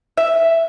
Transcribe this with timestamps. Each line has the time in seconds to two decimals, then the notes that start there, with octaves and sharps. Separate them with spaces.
0.17 E5